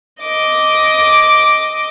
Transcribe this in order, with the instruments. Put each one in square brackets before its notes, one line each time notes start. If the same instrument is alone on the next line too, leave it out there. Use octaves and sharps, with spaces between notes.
[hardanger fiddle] D#5 D6